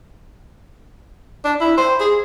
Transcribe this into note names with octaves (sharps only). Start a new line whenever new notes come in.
D4
E4
C5
G#4